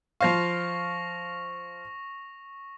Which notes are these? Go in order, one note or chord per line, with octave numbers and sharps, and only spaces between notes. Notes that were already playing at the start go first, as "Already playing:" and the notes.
F3 C5 F5 C#6 A#6 F7